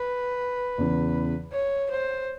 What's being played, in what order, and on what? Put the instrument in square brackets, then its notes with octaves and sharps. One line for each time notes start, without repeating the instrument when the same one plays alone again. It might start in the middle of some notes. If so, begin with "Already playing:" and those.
Already playing: [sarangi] B4
[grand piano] E2 C#3 E3
[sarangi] C#5
C5